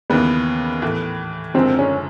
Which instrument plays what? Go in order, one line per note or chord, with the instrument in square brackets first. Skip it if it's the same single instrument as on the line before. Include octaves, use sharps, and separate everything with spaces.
[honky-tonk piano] D#2 C#3 E3 [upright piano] B3
[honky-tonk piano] A2 E3 A3
[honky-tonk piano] F#1 F#2 D3 F3 G#3 [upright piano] C4
[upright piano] C#4